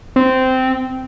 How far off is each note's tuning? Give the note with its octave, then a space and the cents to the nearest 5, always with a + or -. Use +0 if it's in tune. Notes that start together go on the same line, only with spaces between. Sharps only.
C4 -15